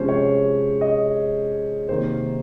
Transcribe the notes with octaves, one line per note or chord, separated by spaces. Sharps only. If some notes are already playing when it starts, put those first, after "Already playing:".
Already playing: C3 F3 G#3 C#4 C5
C#5
D#5
C3 D#3 A#3 C5